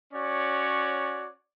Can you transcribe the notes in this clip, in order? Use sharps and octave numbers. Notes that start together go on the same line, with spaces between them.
C#4 F#4 C#5 D5